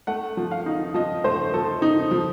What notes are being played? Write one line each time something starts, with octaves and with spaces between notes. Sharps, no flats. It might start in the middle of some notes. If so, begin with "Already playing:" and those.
A3 F#5
F3
F5
D#4
F3 D#5
A3 C5
F3 A4
D#4
F3